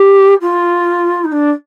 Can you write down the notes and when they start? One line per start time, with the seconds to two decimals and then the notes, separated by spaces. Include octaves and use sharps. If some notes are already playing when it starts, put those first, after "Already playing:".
Already playing: G4
0.41 F4
1.25 D#4
1.32 D4